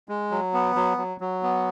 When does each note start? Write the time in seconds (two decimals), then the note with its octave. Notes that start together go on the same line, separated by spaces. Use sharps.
0.09 G#3
0.31 F#3
0.54 B3
0.76 F#3
0.97 F#3
1.21 F#3
1.43 B3